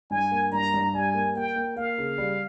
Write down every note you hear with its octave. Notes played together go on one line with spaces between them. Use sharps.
G2 G#5
A#3
G2 A#5
G2
G3 G#5
A#3
A#3 G5
A#3
A#3 F5
C#3
G3